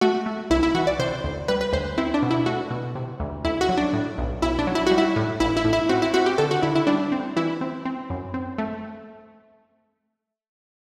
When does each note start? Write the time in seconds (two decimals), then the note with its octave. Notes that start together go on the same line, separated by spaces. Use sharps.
0.01 A3 F#4
0.26 A3
0.50 C2 E4
0.63 E4
0.75 E3 F#4
0.87 D5
0.99 C3 C5
1.24 D2
1.48 G3 B4
1.61 B4
1.73 D2 C5
1.98 C4 E4
2.14 D4
2.23 B2
2.31 E4
2.46 A3 F#4
2.71 B2
2.95 C3
3.20 D2
3.45 D2 E4
3.61 F#4
3.69 F#3
3.77 D4
3.93 A2
4.18 B1
4.42 B1 E4
4.59 D4
4.67 F#3
4.75 E4
4.86 G3 F#4
4.98 E4
5.16 A2
5.40 A1 E4
5.57 E4
5.65 A2
5.73 E4
5.89 C4 F#4
6.02 E4
6.14 C4 F#4
6.26 G4
6.38 D3 A4
6.51 F#4
6.62 D3 E4
6.75 E4
6.87 G3 D4
7.12 C4
7.36 E3 E4
7.61 C4
7.85 C4
8.10 F#2
8.34 C4
8.58 A3